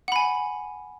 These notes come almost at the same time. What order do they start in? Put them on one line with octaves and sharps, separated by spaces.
F#5 B5 G#5